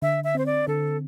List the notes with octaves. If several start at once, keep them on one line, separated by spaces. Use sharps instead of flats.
D3 E5
E5
C4 C5
D5
D3 A4